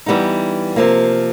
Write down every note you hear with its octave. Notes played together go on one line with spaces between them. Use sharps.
E3 G3 B3 D#4
C3 F3 A#3